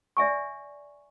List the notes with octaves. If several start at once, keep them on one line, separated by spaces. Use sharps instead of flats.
D5 E5 G#5 C#6